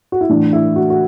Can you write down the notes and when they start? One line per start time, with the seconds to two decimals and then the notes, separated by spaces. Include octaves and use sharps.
0.12 F#4
0.21 E4
0.29 A2 E3 D4
0.53 E4
0.76 F#4
0.90 F#4